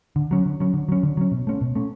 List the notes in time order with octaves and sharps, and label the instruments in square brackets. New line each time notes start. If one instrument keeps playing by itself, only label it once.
[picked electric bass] D3
F#3 C#4
D3
F#3 C#4
D3
F#3 C#4
D3
F#3 C#4
B2
A3 C#4
B2
A3 C#4